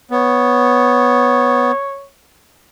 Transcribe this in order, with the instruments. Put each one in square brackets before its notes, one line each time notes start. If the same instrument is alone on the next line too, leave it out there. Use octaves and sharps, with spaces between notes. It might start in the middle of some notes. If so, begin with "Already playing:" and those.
[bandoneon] B3 [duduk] C#5